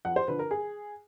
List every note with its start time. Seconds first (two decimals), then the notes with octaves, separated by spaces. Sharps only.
0.05 F2 F#5
0.16 C5
0.28 D3 F3 B4
0.39 A#4
0.51 G#4